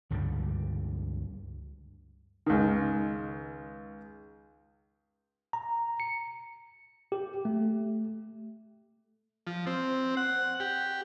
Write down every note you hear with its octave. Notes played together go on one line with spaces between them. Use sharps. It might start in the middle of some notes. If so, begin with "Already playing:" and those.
C#2 G2 D3 G3
C#2 D#3
A#5
C#7
G4
A3
F3
C4
F#5
G4